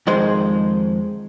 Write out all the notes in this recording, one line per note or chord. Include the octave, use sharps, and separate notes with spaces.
F2 D#3 G#3 C5